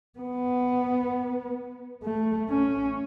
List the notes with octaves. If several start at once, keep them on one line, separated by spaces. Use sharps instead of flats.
B3
A3
C#4